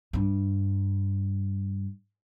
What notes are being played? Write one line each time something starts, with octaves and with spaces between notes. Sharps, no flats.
G2 D4